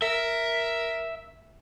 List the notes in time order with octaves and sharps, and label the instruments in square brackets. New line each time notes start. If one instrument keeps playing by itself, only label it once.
[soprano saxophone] A#4 [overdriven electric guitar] E5